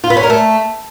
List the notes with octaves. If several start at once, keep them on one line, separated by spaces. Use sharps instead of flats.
F4
B3
C#4
A#4
A3